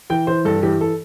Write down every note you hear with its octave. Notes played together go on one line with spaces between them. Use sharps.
E3 G5
E3 C5
G2 A4
E3 G4
A4